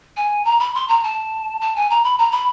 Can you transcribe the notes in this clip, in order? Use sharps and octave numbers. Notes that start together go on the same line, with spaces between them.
G#5
A#5
B5
C6
A#5
A5
A5
G#5
A#5
B5
A#5
B5